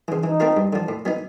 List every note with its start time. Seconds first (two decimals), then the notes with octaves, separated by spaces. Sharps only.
0.08 C#3 E3
0.24 E3 D#4
0.40 A3 C4 F4 A#4
0.57 G2
0.73 D3 F3
0.89 A2
1.05 F#3 B3 D#4